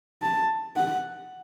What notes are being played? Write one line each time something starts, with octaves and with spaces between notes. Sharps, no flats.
A5
F#5